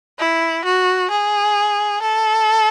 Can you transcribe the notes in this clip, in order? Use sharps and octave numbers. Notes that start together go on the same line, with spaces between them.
E4
F#4
G#4
A4